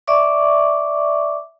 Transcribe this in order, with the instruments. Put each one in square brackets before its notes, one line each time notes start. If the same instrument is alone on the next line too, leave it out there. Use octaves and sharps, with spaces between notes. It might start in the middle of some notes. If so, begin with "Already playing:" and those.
[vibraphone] D5 E5 C#6 D6